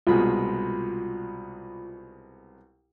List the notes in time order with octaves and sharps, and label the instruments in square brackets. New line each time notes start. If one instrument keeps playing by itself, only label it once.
[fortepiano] C2 B2 G#3 [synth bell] F4 B5